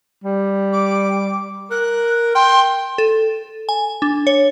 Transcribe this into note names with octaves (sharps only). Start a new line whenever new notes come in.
G3
D6
A#4 F#6
G5 C6
A4
G#5
D4
C#5